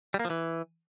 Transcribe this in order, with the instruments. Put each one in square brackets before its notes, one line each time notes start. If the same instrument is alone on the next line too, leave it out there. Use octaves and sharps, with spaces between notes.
[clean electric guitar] G3
A#3
F3
E3